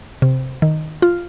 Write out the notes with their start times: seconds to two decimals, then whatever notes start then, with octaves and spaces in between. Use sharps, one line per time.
0.22 C3
0.62 D#3
1.02 F4